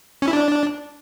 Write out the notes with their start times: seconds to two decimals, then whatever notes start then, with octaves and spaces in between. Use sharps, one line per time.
0.22 C#4
0.28 E4
0.33 D4